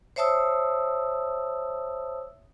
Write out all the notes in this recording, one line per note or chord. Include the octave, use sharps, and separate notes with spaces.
C5 C#5 E5 A5 D#6 E6